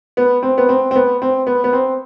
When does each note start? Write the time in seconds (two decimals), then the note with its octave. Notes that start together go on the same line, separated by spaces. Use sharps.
0.17 B3
0.43 C4
0.58 B3
0.69 C4
0.91 C4
0.96 B3
1.22 C4
1.47 B3
1.64 B3
1.73 C4